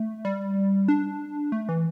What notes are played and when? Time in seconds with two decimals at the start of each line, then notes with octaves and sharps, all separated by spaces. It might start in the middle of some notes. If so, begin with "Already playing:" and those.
Already playing: A3
0.25 G3
0.88 D4
1.52 A3
1.69 E3